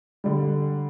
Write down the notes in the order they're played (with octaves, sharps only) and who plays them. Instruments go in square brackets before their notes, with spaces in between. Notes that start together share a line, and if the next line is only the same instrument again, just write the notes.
[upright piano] D3 G3